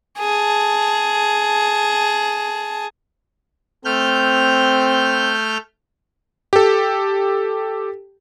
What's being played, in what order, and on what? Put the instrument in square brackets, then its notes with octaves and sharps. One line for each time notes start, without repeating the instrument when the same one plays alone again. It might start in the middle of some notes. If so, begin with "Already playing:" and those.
[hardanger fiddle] G#4 A5
[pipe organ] A3 F6 G6 [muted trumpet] C4
[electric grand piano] G4 A4